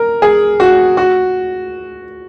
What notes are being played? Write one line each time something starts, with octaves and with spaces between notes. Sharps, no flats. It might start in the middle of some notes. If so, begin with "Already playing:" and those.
Already playing: A#4
G#4
F#4
F#4